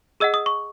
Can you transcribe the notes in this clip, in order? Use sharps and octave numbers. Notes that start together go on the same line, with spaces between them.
G#4 D#5 F#5 E6
D#6
C#6